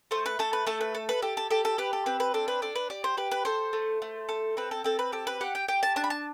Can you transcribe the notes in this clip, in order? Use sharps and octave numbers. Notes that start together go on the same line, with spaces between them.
A3 C5
B4
A3 A4
B4
A3 A4
B4
A4
B4
G4 A4
A4
G4 A4
A4
G4 B4
A4
C4 B4
B4
D4 A4
B4
D4 A4
B4
G4 D5
C5
G4 B4
B4
A4 C5
A3
A3
A4
C4 B4
A4
C4 A4
B4
G4 A4
B4
G4 F#5
G5
G4 G5
A5
D4 A5
B5
A5